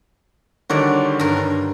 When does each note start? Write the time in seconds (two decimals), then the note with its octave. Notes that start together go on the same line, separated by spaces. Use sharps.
0.70 D3 D#3 G3 F#4 C#5 D5
1.19 G2 A#4